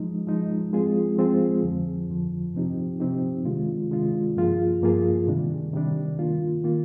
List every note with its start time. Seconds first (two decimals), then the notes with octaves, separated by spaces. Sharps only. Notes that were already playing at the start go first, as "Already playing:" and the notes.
Already playing: F3 G#3 D#4
0.27 F3 G#3 D#4
0.73 F3 G#3 C4 F4 G#4
1.18 F3 G#3 C4 F4 G#4
1.63 F2 D3 F3
2.09 F2 D3 F3
2.54 C3 F3 C4 D#4 G4
3.00 C3 F3 C4 D#4 G4
3.45 C3 D#3 G#3 D4 F4
3.91 C3 D#3 G#3 D4 F4
4.37 G2 F3 A#3 F4 G#4
4.82 G2 F3 A#3 F4 G#4
5.28 C3 D#3 G3 D4
5.73 C3 D#3 G3 D4
6.18 D#3 A#3 F4
6.64 D#3 A#3 F4